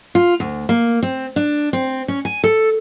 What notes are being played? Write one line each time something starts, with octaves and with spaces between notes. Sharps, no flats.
F4
D2
A#3
C4
D4
C4
C#4
G#5
A4